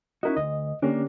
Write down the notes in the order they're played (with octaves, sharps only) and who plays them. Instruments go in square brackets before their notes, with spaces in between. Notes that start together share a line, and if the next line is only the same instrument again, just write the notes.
[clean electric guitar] C#4 E4 F#4 [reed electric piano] D#4 A#4 D#5
[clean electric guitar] D2 [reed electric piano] D#5
[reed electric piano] D3 C#4 G4 [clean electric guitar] A#3 D4